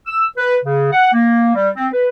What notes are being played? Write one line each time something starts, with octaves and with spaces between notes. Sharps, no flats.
E6
B4
C#3
F#5
A#3
G3
C4
B4